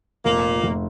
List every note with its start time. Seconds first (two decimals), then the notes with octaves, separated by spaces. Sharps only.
0.25 F1 A#2 A#3
0.63 F1